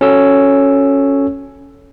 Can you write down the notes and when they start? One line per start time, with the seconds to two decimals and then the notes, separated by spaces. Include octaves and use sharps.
0.01 C#4 F#4 A4 C#5 E6